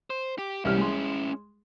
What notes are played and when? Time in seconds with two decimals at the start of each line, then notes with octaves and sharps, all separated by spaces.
0.10 C5
0.38 G4
0.65 C2 G3 C#4 E4 F6
0.78 G#3 C6